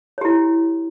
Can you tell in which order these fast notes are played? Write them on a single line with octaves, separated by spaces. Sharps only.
C#5 G4 E4